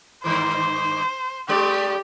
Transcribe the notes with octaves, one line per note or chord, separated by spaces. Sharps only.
G2 D#3 E3 C5
G2 G#3 G4 D5